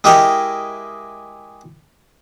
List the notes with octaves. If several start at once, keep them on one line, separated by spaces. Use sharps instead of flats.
G#3 E4 G4 A#4 D#5